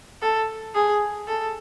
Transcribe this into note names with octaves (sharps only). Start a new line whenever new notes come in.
A4
G#4
A4